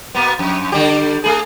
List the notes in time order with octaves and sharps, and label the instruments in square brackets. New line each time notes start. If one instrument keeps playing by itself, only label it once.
[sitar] B2 A#3 B3
F2
D3 G3 G4
A3 G#4